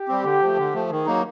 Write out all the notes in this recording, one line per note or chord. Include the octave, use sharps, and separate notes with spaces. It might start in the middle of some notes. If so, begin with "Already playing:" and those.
Already playing: G4
G3 C4
D3
F3 A3
D3
F3 A3
D#3 G#4
F#3 A#3 D#4